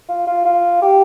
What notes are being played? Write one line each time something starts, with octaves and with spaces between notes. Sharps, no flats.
F4
F4
F4
G4